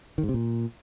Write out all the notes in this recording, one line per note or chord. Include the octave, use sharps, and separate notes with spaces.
D#3
G#2
C3
A#2